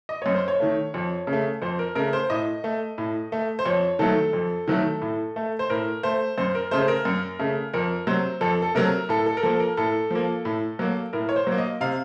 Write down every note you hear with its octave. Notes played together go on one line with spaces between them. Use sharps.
D#5
F#2 C#5
C5
C#5
D#3 A3
F2
C#3
A3
F2 C5
A#4
C#3 A3 A#4
C5
A2 D#5
A3
A2
A3
C5
F2 C#5
D#3 F#3 A3 A4
F2
D#3 F#3 A3
A2
A3
C5
A2 A#4
A3 C5
F#2 C5
A#4
C#3 A3 C5
C5
A#4
F#2
C#3 A3
F2 A#4
C3 F#3 C5
F2 A4
A4
C3 F#3 A#4
A2 A4
A4
A#4
F3 A#3 A4
A#4
A2 A4
F3 A#3
A2
F#3 A#3
A2 A#4
C#5
C5
F#3 A#3
D#5
C3 F5